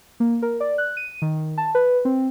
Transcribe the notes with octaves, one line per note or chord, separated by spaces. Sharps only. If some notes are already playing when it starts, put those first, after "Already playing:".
A#3
A#4
D5
F#6
D#7
D#3
A5
B4
C4